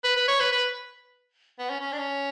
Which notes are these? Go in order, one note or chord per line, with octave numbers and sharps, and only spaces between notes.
B4
B4
C#5
B4
B4
B3
C#4
C#4
D4
C#4